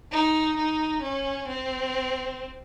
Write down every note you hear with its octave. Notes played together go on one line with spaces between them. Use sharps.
D#4
D#4
C#4
C4